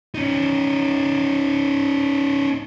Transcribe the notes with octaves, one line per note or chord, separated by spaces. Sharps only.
C#4 D#4